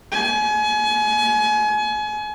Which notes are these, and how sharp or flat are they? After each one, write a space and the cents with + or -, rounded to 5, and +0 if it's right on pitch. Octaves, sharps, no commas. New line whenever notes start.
G#5 +30